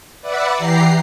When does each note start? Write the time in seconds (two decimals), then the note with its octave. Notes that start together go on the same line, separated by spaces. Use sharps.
0.21 B4 D5 E5 F#5
0.56 E3 G4 A#5 C7